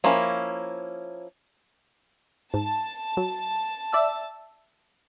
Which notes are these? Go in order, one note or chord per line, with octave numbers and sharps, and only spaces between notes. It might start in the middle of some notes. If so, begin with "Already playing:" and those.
F3 A#3 C#4 E4
G#2 A5
F#3
D5 E5 E6